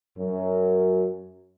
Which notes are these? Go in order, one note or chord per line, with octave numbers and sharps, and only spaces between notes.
F#2